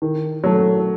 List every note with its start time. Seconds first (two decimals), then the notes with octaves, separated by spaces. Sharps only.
0.02 D#3
0.44 F#3 A3